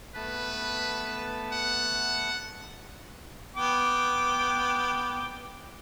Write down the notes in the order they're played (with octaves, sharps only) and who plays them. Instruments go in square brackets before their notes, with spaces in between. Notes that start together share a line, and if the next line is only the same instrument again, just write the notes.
[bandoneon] A3 B3 A5 [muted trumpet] B4
[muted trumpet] F#5
[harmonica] B3 G5 D6